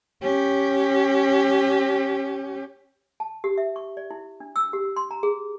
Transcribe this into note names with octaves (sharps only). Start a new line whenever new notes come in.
C#4 G4
A5
G4
E5
C#6
D5
E4
D4
E6
G4
C6
A#5
G#4